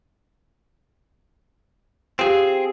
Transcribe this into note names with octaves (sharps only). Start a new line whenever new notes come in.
C4 F4 G4 G#4 F5